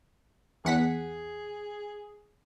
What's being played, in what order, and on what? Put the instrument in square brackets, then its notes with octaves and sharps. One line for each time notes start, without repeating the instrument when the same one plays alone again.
[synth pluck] E2 F#5 B6 [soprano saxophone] G#4